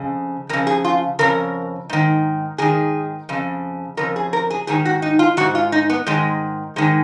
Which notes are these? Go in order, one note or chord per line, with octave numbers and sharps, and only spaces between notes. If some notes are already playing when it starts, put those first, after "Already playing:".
Already playing: F2 C#3
F2 C#3 A#4
G#4
F4
F2 C#3 A#4
G#2 D#3
G#2 D#3 G#4
F2 C#3
F2 C#3 A#4
G#4
A#4
G#4
G#2 D#3 G#4
F#4
D#4
F4
G#2 D#3 F#4
F4
D#4
B3
G#2 D#3 G#3
G#2 D#3 G#3